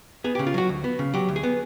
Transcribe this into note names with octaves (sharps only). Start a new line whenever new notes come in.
B3 G#4
C#3 G4
F4
F#3 F#4
D2
B3
C#3
F#3 G4
D2
G#4
B3